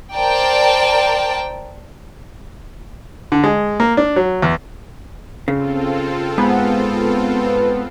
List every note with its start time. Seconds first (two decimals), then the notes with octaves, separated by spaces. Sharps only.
0.16 A#4 C5 D5 G5 A5
3.32 D3
3.44 G#3
3.80 A#3
3.97 D4
4.16 F#3
4.42 E2
5.48 C#3 C4 F4 A4
6.38 G#2 B3